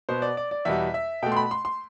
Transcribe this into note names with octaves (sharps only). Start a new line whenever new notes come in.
B2 B3 C5
D5
D5
D5
E2 B2 G3 E5
E5
B2 A3 G5
C6
B5
C6
C6